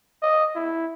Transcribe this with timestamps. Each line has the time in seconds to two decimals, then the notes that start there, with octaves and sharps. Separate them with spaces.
0.22 D#5
0.56 E4